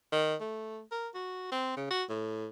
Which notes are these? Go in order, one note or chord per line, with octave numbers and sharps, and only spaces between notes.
D#3
A3
A#4
F#4
C4
C#3
F#4
A2